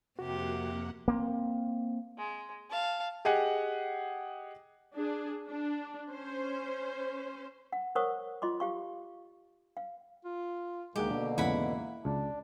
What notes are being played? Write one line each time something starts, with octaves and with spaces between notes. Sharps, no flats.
F2 C3 A#3 F#4 G4 F#5
A#3 C4
G#3
F5 A5
G4 G#4 D#5 F#5
D4 G#4
D4
C#4 C5
F#5
A#4 C5 C#5 F#5 C#6 D#6
F4 D#5 C6 D6
G4 F5 C#6
F5
F4
D2 D#3 G#3 A#3 G4 G#4 F#5
B2 D3 D4
E2 G#2 C#3 E4 F#5 B5
C#2 D4